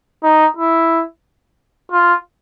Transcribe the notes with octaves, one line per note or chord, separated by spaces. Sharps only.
D#4
E4
F4